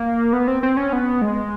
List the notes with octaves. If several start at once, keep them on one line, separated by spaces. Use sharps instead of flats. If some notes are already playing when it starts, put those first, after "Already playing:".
Already playing: A#3
B3
C4
C4
C#4
B3
G#3